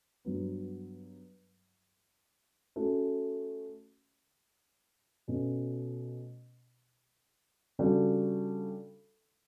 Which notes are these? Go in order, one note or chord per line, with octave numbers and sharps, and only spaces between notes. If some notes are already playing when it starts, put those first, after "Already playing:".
G2 F#3 B3
A3 C#4 F#4
B2 A3 C#4
C#3 G3 D4 F#4 A4